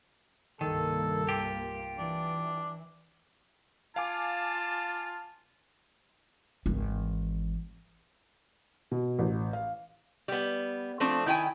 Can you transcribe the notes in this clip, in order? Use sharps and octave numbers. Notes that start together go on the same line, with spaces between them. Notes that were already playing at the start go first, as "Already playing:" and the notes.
C2 G2 D#3 A#3 A4
F4 G4
E3 D4
F4 F5 G#5 A5 D6
G#1 E3
B2
A1
F5
G3 B3
F3 A3 C4 D4
D#3 E4 G5 G#5